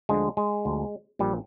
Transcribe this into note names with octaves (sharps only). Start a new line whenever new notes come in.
D2 D3 F3 G#3
G#3
D2 D3 F3
A#1 A#2 F3 G3